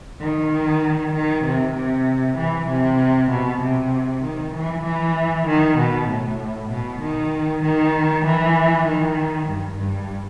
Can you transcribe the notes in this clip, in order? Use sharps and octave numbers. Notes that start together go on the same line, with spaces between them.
D#3
D#3
C3
C3
E3
C3
B2
C3
D#3
E3
E3
D#3
B2
A2
B2
D#3
D#3
E3
D#3
G2
G2